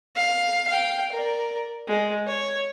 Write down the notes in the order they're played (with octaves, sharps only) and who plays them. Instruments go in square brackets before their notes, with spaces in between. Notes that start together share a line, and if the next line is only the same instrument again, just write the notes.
[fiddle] F5
F5 G5
A#4 D5
G#3
C#5